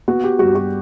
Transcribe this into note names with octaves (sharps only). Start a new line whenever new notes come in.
B3 F#4
G4
G2 F#4
F#4